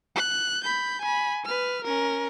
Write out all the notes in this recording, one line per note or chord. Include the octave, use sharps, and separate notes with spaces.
F#6
B5 G6
G#5 B5
B4 F6
C#4 A#4